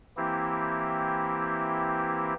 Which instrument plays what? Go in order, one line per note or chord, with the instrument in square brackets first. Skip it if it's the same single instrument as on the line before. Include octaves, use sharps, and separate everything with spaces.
[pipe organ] E3 A#3 C4 E4 G4